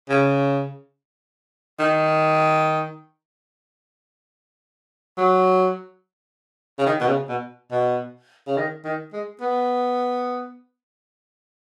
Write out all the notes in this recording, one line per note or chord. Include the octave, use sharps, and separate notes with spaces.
C#3
D#3
F#3
C#3
D#3
B2
C#3
B2
B2
C#3
D#3
D#3
G#3
B3